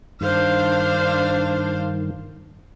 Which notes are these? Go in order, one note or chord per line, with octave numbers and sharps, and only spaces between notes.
G2 D#3 D4 C5 F5